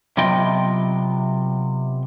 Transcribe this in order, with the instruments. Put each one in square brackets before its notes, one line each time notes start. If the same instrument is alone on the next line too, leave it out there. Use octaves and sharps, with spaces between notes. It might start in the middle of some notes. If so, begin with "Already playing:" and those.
[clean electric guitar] C3 F#3 B3 F4 D#5 G5